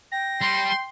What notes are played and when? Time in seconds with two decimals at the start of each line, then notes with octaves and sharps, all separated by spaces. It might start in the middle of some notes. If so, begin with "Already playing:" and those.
0.12 G5 A#6
0.41 G3 C6